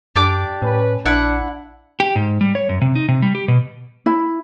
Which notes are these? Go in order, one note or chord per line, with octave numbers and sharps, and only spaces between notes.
F#2 D4 G4 D6
A2 C#4 B4
A#1 D4 E4 F#5
G4
G#2
G3
C#5
F#2
C3
D#4
C3
G3
G4
B2
E4